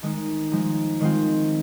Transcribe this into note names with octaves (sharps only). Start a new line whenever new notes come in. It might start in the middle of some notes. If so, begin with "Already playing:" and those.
D#3 G#3 D#4
F3 G#3 D#4
D#3 G#3 C4 F4